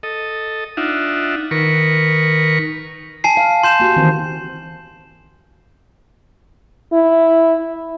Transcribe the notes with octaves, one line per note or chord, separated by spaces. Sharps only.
A4 D#5
D4 D#4 F4 E5 F#5
D#3 A#4 B4 C#6
G#5 A5 C7
F5
C6 G6 E7
A#3 F#4 G4
D#3 E3 C4
E4